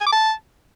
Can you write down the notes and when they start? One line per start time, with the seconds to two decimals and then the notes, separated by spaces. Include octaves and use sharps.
0.01 G#5
0.07 D6
0.12 A5